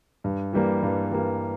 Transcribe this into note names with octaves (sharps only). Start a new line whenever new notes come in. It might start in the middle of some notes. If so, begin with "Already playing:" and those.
G2
E3 G3 A#3
G2
E3 G3 A#3